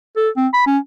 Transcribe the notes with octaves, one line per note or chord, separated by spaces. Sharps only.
A4
C4
B5
C#4